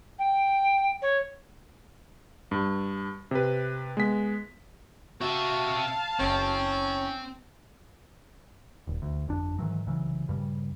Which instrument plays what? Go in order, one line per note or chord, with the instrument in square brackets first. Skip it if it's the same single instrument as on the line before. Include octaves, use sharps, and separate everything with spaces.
[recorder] G5
C#5
[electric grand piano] G2
C3 B4
G#3 B3 B6
[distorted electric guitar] C4 E5 [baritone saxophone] F#4 [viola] F5 A5
[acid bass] F#1 [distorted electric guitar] C4 [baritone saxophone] C#4
[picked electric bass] D#1
D2
G1 F2 D4
G#2 D#3 E3 F#3
C2 C#3 E3 F#3
A#1 G2 C#3 G3